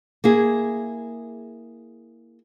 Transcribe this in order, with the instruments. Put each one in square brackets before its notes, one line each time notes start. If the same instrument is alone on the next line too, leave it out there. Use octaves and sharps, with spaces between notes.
[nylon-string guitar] A#3 E4 G#4